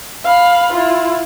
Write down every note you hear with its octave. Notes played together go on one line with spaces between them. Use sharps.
F5 B5
E4 F4